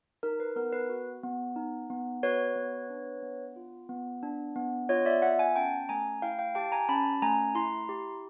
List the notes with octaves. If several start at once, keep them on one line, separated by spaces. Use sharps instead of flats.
D#4 A#4
B4
B3 A#4
B4
F#4
B3
D#4
B3
F#4 B4 C#5
B3
D4
B3
F4
B3
D4
B3
F4 C#5 D#5
D5 E5
B3 E5 F#5
F#5 G#5
C#4 G5 A5
A3 G#5 A#5
E4 F5 G5
F5 G5
G4 G5 A5
G#5 A#5
C#4 A5 B5
A3 G#5 A#5
E4 A#5 C6
G4